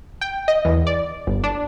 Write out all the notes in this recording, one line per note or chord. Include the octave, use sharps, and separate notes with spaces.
G5
D#5
E2
D5
G1
D4